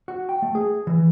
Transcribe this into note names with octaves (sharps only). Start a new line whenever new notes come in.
F#4
G5
A3
G#4
E3